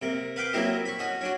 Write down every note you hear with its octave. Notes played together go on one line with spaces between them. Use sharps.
C3 A#3
B4 F5 G5 D6
F#3 A#3 C4 E4 G4 D#5
B5 C#6
C#4 F#4 D#5
C#4 D4 F#4